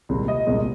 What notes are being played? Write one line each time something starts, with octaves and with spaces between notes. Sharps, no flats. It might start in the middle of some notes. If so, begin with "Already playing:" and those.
C2 A#2 G#3 C4
D#5
C2 A#2 G#3 C4